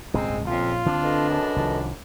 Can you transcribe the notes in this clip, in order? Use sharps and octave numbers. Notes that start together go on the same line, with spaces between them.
D#1 G#1 C#2 G#3 C4
A#1 F2 C#3 F4
D2 D3 C4 D4
A4 B4 D#5
F#2
C2 D#3 F3